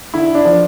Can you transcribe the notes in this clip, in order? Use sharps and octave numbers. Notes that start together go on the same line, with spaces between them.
D3 E4
D4
F3